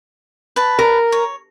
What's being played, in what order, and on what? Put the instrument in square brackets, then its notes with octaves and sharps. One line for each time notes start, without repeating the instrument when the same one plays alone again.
[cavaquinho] B4 A5
[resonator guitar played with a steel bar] A#4
[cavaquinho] C#5